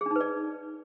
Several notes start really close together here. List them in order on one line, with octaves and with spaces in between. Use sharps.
G#4 D4 D#4 B4 D5